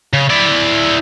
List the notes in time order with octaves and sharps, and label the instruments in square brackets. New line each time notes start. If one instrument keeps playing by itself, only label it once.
[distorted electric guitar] C#3
E4 D5